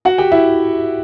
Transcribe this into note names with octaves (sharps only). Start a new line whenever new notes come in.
F#4 F#5
G4 G5
E4 E5